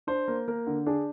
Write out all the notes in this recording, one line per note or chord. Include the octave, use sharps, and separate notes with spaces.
D4 C5
A#3
A#3 A#4
D3
D4 G#4